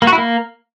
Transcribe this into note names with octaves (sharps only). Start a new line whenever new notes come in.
A#3
F#4
E4
A#3